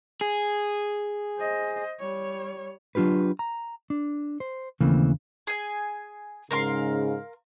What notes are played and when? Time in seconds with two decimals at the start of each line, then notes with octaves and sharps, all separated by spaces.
0.21 G#4
1.38 C5 D#5
1.99 G3 C#5
2.95 F#3 D4 F4 G4 B4
3.39 A#5
3.90 D4
4.40 C5
4.81 D#2 C#3 E3 A3 A#3 C4
5.47 G#4 G#5
6.51 G#2 C#3 A#4 F5 C6